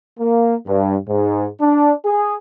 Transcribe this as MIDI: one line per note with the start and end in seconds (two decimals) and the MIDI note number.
0.19 0.56 58
0.67 0.96 43
1.09 1.46 44
1.61 1.92 62
2.06 2.35 68